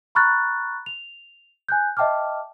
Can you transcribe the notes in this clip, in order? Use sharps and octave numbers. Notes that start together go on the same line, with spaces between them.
A#5 B5 C#6 F6 F#6 A6
F7
G#5 F#6 G6
D#5 E5 G5 A5 D6 F6